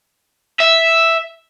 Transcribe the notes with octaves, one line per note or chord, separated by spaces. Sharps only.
E5